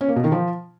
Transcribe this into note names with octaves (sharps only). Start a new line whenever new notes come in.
C#4
A#3
B2
D#3
F3